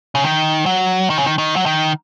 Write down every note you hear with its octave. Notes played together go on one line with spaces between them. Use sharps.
C#3
D#3
F#3
D#3
C#3
D#3
D#3
F#3
D#3